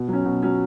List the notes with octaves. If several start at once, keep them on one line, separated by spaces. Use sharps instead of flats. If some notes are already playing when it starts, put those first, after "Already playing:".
Already playing: B2
F#3 C#4
B2
F#3 C#4